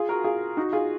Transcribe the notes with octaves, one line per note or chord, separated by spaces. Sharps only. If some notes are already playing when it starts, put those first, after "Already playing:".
Already playing: F4 G#4
F#4 A#4
F4 G#4
D#4 F#4
F4 G#4